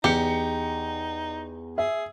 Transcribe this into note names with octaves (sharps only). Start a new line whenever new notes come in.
E2 D#4 G4 C#7
G#4 E5